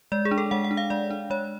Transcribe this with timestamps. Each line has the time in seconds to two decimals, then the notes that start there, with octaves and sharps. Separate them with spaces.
0.12 G#3 D5
0.25 G#4
0.31 D4
0.38 A4
0.51 G#3 F#5
0.64 F#5
0.71 D4
0.77 F5
0.90 G#3 D5
1.10 D4
1.30 G#3 C#5